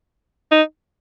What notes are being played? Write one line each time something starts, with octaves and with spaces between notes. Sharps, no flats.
D#4